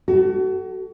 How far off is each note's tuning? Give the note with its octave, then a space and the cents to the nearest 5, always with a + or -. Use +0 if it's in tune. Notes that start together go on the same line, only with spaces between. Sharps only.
F#4 +35 A4 +0